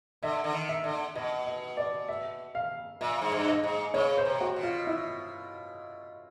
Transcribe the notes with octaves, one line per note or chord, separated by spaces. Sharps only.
D3 E5
D3
D#3
E5
D3
B2 D#5
D#5
D5
E5
F5
A#2 E5
G#2
G2
D#5
G#2
C#3 C#5
C5
C3
F#4
B2
F4
E4